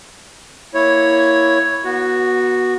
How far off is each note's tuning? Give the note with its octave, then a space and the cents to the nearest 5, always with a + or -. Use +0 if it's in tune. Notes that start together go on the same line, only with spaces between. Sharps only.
A#3 +0 E4 +0 C#5 +0
B3 -30 F#4 +0